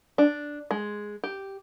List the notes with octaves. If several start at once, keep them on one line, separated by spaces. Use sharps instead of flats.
D4
G#3
G4